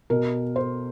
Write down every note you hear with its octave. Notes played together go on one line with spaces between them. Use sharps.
B2 A#4
C5